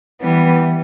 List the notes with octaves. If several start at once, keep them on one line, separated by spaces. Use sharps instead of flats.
E3 G3 B3